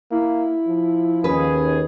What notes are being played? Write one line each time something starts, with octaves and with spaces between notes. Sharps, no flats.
A#3 E4
F3
D#2 C#4 G#4 B4